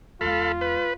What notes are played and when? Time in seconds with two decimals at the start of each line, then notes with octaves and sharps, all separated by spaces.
0.21 E2 G#3 F4 A4 F5 B5
0.61 B4